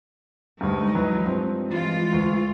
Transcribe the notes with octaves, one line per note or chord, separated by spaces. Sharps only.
D2 G2 G#3 D#4
E3 F#3 B4
G2 F3 C4
E3 G#3 F4
D2